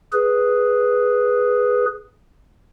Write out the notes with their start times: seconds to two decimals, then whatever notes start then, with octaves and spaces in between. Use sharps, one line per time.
0.13 G#4 B4